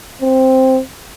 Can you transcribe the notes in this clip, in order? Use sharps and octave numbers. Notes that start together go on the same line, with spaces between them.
C4